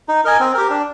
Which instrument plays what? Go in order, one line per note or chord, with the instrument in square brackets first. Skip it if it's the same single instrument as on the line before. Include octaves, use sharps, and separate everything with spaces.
[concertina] D#4
A#4 D#5 G#5
C4
G4 A#4
D4